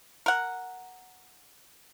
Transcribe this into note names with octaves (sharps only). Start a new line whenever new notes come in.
A#4 F#5